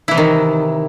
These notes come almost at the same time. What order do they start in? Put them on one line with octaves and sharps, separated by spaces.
E4 E3 C3 D#3